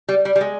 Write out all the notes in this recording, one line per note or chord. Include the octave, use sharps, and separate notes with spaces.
G3
G3
G3
G#3